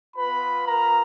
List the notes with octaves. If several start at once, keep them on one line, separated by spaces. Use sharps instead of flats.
B3 F4 B4 B5
A#4 A#5